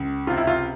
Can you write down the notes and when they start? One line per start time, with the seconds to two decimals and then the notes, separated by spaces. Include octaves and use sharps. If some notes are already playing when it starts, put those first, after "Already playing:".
Already playing: C#2
0.27 C3 F4
0.37 E4
0.47 F4